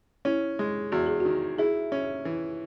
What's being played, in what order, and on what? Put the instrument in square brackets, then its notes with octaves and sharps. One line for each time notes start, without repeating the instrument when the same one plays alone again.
[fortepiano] C#4 [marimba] E4
[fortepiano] G#3
[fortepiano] E2 [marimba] F#4
[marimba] G#4
[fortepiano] D#3 [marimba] F#4
[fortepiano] E4 [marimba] G#4
[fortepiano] C#4
E3